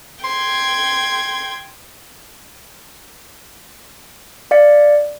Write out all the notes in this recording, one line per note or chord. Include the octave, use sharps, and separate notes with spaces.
G5 C6 G#6
D5 F5 A6 C#7